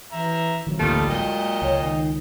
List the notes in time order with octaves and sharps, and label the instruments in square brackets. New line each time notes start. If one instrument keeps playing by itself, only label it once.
[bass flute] E3 [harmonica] E5 A#5
[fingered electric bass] D#3 F3 F#3 [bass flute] C4
[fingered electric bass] A1 D2 A#3 [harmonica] D#3 G3 F4 [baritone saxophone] A3
[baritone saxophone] A#2 [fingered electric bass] F#3 [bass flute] G#3 [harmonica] D#5 G5
[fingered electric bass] C#2 [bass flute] C#5
[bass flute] D#3